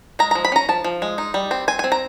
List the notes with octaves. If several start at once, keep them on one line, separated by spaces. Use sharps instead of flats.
G#3 A#5
F3 A#5
B5
C#4 A#5
F3 A5
F3
G#3
D#4
G3
C4
C4 G#5
C4 G#5
A#5